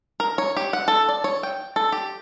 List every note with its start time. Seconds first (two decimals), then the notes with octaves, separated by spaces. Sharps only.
0.20 A#4
0.38 C#5
0.57 G4
0.73 F#5
0.88 A4
1.09 D5
1.24 C#5
1.43 G5
1.76 A4
1.92 G4